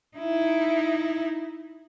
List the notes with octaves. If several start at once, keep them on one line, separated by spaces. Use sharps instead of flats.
D#4 E4